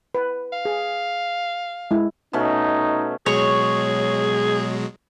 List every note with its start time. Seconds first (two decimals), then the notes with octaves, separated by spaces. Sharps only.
0.15 B4
0.53 F5
0.65 G#4
1.91 G#3 E4
2.33 B2 A3 C#4 D#4
3.26 B2 F#3 G#3 G#4 C#5